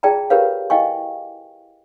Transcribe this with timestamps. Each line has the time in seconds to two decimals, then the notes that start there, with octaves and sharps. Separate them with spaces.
0.03 F4 G#4 D5 G5 A5 A#5
0.30 F4 G4 A#4 B4 C#5 F5
0.70 E4 D#5 F5 G5 G#5 C#6